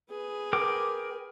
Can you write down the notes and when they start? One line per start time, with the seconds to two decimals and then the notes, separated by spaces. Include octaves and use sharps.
0.10 G#4 B4
0.53 A#4 G5 D6